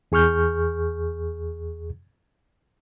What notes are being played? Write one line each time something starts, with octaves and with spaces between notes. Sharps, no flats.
E2 G#4 C#6 F6 G6